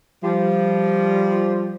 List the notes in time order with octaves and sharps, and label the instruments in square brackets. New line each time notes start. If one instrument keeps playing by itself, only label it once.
[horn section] F3 G3